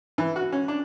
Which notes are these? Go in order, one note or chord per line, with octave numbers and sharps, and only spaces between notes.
E3
F#4
C#4
D4